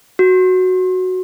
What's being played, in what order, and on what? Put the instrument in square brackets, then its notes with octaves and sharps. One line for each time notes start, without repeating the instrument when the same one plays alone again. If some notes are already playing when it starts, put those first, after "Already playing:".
[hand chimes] F#4